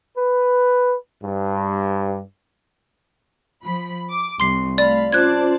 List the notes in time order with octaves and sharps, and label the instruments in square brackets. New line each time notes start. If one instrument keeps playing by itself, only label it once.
[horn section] B4
G2
[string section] F3 B5
D6
[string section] C2 [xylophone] C6 C7
[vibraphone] A3 [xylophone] D5 [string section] F5 B5
[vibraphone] C#4 F4 [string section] C5 D5 A5 [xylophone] F#6 G#6